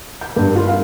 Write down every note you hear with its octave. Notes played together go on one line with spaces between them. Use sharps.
G6
G2
F4
F5